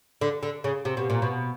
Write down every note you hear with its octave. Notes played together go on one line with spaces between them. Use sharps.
D3
D3
C#3
C3
B2
A#2
B2